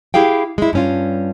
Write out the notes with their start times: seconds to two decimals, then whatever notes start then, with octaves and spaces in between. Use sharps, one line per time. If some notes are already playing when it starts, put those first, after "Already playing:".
0.14 E4 G4 G#4 F5 G5
0.58 G#3 E4
0.73 G2 C#4 F4